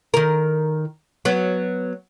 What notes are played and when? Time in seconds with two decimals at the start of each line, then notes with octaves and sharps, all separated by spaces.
0.14 D#3 A#4
1.25 F#3 B3